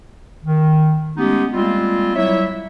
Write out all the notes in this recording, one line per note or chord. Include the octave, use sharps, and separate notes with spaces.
D#3
G#3 A3 B3 C#4 D#4 G4
G3 G#3 A#3 C4 F4
F#3 G3 E4 C#5 E5